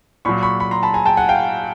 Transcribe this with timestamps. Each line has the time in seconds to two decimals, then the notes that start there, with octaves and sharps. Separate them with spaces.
0.25 A#2 F#3 B5 C#6
0.42 B5 C#6
0.60 B5 C#6
0.71 A#5 C6
0.83 A5 B5
0.94 G#5 A#5
1.06 G5 A5
1.17 F#5 G#5
1.29 F5 G5